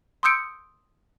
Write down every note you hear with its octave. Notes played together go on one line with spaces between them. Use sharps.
C6 D#6 E6 G6 C#7 D7